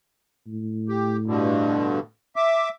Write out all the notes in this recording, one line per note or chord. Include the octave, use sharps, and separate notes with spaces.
A2
G4
G2 B2 D3
E5 D6